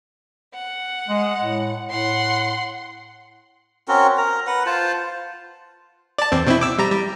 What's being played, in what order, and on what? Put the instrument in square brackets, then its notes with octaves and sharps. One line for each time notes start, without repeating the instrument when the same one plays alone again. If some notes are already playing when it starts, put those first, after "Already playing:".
[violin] F#5
[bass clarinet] G#3
A2
[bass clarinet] A2 [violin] F#5 C6
[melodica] C4 C#4 F#4 A#4
A#4 A#5
B4 F#5
F4 C5 A5
[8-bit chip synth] D5 A5
E2 C4
B2 C4 E4
D6 E6
G3 A#5
G3